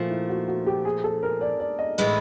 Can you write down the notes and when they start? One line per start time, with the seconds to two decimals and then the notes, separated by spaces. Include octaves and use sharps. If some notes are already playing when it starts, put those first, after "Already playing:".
Already playing: A#2 F3 A3 F4 F#4
0.10 E4
0.29 F#4
0.48 F#4
0.66 G4
0.85 G#4
1.04 A4
1.23 A#4
1.41 D5
1.60 D5
1.79 D#5
1.98 A2 E3 G#3 B3 E4